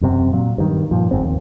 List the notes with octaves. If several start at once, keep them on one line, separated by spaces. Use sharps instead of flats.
E1 F#2 C3 C4
A#2 F#3
G2 D#3
G2 A#2 F3
G1 F2 G#2 C4
D#2